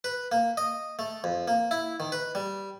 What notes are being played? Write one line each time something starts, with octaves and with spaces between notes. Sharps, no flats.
B4
A#3
D#5
A3
F2
A#3
E4
D#3
B4
G3